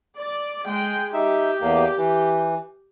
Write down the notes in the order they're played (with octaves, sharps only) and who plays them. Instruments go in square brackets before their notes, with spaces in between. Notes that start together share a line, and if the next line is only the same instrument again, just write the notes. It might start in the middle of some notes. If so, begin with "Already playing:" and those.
[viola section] D5
G#3 G5
[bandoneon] D#4 E5 [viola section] G4
[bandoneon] E2 A#3
E3